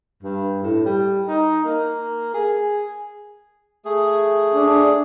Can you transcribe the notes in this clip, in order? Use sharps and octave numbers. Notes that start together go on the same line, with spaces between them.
G2
A2
G3
D#4
A#3
G#4
A3 G#4
D4